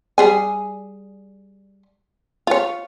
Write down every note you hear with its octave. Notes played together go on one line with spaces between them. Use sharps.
G3 G#4 G#5
F4 C#5